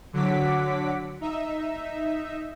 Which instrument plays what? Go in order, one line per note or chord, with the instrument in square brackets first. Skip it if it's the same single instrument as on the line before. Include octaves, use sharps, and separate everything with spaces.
[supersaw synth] D3 F#3 F#5 D6 B6
D#4 E5